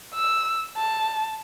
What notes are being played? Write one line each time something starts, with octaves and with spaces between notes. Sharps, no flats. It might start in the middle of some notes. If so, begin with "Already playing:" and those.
E6
A5